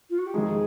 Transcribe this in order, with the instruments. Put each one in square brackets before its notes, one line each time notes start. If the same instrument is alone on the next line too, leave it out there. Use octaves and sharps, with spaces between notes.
[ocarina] F4
F#4
G4
[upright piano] F2 C3 D#3 G#3 [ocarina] G#4